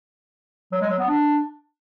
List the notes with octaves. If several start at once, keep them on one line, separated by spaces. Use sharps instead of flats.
F#3
G#3
F#3
B3
D4